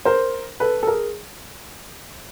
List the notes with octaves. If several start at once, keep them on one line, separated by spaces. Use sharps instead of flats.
A#4 C5
A4 B4
A4
G#4 A#4